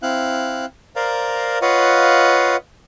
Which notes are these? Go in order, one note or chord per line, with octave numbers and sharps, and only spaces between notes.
C4 E4 F5 F#6
A#4 C5 D5 F5 A#5
F4 B4 C#5 D#5 F5 F#5